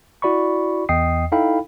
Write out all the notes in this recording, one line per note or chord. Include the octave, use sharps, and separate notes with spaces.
E4 F#4 D5 B5 C#6
E2 D#5 G5 D#6 C7
D#4 E4 A4 F5 G5 B5